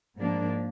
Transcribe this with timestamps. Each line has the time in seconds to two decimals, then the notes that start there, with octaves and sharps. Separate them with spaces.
0.17 G#2 F3 A#3 D4